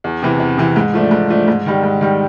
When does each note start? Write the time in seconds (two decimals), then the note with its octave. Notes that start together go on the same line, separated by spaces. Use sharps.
0.04 E2
0.22 C3 E3
0.40 E2
0.58 C3 E3
0.76 G#2
0.93 F3 A3 D4
1.11 G#2
1.29 F3 A3 D4
1.48 G#2
1.66 D#3 G3
1.83 G#2
2.01 D#3 G3